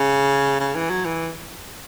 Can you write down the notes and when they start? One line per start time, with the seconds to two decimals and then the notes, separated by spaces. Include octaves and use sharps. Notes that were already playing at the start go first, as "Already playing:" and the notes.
Already playing: C#3
0.60 C#3
0.75 E3
0.90 F#3
1.06 E3